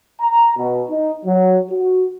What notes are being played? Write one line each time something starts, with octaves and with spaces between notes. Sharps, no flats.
A#5
B2
D#4
F#3
F#4